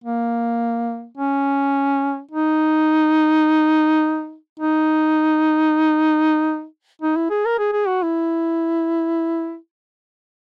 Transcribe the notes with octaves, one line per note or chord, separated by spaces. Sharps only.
A#3
C#4
D#4
D#4
D#4
E4
G#4
A#4
G#4
G#4
F#4
E4